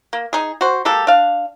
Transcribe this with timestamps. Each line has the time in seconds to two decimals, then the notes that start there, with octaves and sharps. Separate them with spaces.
0.13 A#3
0.33 D#4 G#4
0.61 F#4 C5
0.85 G#3 A#3 G4 A4
1.07 D4 F5